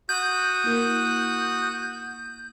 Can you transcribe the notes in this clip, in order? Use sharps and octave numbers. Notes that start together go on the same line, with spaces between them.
F#4 D#6 F#6 G6
A#3 E4 A#4